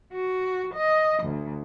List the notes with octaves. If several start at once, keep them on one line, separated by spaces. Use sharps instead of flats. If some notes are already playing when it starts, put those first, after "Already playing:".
F#4
D#5
D2